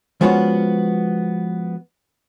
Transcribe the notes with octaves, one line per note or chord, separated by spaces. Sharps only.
F3 G#3 B3 C#4 F4 F#4